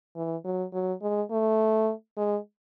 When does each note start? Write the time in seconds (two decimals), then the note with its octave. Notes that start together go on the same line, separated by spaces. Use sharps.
0.16 E3
0.45 F#3
0.73 F#3
1.02 G#3
1.31 A3
2.17 G#3